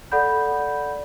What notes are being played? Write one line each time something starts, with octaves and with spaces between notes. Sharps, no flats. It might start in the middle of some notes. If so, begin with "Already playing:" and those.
A4 D5 F#5 B5 G6